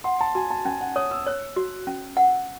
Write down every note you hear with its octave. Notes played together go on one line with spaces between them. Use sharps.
F#5 C6
A5
F#4 G#5
A5
C#4 G#5
F#5
C#5 D#6
E6
C#5 F#6
F#4
C#4
F#5